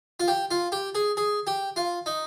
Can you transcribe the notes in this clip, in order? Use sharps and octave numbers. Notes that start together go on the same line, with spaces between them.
F4
G4
F4
G4
G#4
G#4
G4
F4
D#4